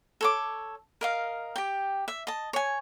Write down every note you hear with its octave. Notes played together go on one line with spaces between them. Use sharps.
A4 C#5 D6
A#4 D#5 F5
G4 G5
E5
D#5 A5
C#5 G#5